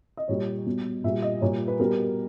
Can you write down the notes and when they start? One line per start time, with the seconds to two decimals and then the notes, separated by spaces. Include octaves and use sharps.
0.17 D#5
0.28 A#2 G3 C#5
0.66 B2 G3
1.04 A#2 E5
1.07 G3
1.22 D#5
1.41 A#2 G3 C#5
1.67 B4
1.79 B2 G3 A#4